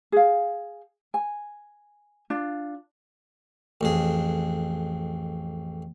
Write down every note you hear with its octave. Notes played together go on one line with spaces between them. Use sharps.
G#4 F5
G#5
D4 F4
A1 F2 G#4